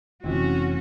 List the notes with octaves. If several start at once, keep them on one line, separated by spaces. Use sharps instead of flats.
F1 E3 C4 C#4 F#4